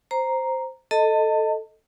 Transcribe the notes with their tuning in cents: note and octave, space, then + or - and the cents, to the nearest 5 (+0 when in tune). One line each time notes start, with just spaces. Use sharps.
C5 +0 A#5 +0
A4 +0 D#5 +0 A5 +35